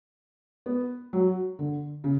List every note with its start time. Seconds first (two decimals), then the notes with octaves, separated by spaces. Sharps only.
0.66 B3
1.13 F#3
1.59 D3
2.04 C#3